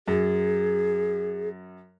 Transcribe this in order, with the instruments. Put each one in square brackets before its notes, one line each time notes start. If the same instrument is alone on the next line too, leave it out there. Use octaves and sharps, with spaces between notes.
[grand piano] F#2 [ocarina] G#4